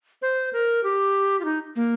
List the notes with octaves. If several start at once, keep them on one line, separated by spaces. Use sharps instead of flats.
C5
A#4
G4
F4
D#4
A#3